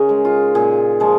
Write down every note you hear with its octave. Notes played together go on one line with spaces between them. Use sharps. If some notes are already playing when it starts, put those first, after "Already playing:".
Already playing: C#3 D#4 G#4 A#4
G#3
F4
A#2 G#4
F3 G#3